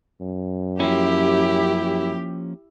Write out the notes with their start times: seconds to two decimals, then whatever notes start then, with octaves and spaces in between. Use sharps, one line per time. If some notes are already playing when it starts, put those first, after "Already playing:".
0.21 F#2
0.80 F3 A#3 C#4 E4 G4